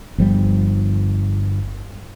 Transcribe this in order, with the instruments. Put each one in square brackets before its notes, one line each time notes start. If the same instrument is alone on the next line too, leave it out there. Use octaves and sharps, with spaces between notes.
[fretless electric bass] G1 F3 G3